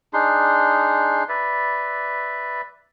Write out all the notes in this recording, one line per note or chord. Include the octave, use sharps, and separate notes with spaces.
D4 D#4 G#4 C6
B4 D5 E5